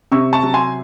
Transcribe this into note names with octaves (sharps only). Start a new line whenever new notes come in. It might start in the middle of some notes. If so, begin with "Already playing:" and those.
C3 C#6 E6
A5 C#6
F#3
G#5 C6